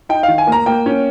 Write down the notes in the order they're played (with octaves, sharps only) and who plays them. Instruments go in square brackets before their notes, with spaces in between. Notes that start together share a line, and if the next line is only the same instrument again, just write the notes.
[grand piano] D#4 G5
D#3 F5
G#5
A#3
A#5
A#3 G5
C#4